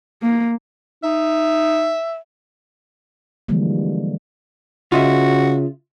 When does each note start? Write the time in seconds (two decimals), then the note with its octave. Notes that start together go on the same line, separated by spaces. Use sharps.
0.23 A#3
1.04 D#4 E5
3.48 D3 E3 F3 G3 G#3 A#3
4.92 C#3 F4 F#4 D#5 E5